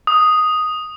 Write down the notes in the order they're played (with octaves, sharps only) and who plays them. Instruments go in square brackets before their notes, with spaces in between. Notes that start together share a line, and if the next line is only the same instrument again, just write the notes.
[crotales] D#6